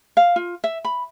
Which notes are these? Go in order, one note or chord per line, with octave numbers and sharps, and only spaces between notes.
F5
F4
E5
B5